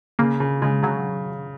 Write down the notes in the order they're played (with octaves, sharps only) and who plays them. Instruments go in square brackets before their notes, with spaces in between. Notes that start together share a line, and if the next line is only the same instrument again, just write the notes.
[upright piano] C#3 [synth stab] A#3
[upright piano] C#3
[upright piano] C#3 [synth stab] G#3
[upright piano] C#3 [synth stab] F#3